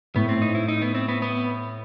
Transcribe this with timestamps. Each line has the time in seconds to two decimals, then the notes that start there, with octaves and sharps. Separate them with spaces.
0.15 A2 B3
0.29 C4
0.42 D#4
0.55 E4
0.68 D#4
0.82 B3
0.95 C4
1.08 B3
1.22 B3